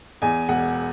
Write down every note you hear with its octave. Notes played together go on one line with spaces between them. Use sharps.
E2 G#5
E1 F#5